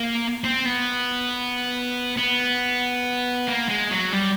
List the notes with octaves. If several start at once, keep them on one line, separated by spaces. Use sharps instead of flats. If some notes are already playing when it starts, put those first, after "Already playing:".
Already playing: A#3
C4
B3
B3
A#3
G#3
F#3
G3